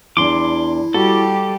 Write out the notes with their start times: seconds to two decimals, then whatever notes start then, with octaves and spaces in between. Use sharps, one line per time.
0.17 E2 D4 E4 C6 D6
0.94 G3 F#4 G4 A4